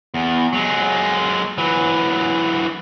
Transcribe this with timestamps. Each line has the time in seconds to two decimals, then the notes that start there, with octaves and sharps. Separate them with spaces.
0.14 E2
0.53 F#3 G#3
1.58 E3 F#3